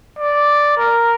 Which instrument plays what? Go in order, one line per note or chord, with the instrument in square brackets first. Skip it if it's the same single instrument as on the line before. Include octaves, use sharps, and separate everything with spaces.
[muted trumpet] D5
A#4